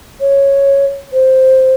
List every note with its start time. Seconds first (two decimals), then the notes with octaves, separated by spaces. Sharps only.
0.21 C#5
1.13 C5